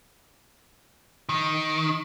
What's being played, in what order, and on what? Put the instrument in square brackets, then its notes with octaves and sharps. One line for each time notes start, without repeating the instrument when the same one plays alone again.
[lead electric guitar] D#3